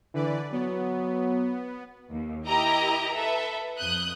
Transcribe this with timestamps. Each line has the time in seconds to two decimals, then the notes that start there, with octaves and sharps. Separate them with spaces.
0.14 D3 E3 B4 D5
0.52 F#3 B3
2.11 D#2
2.47 E4 G4 A#4 D#5 A#5
3.16 A4 B4 E5
3.78 F2 D#6 F#6 G6